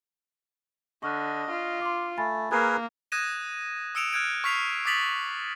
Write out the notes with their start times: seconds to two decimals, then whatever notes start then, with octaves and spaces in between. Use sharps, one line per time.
1.03 D3 D#5 C#6 F6 F#6
1.50 F4
1.81 C6 D6
2.18 A3 G#5 B5 A6
2.51 A#3 G#4 A#4 B4 G#6 C7
3.12 D#6 F#6 G#6 A#6 D#7 E7
3.95 D#6 E6 C#7 D7 E7 F7
4.13 F6 F#6 G#6 D7
4.44 C#6 F6 B6 C7 F7
4.85 D6 D#6 A6 B6 F7 F#7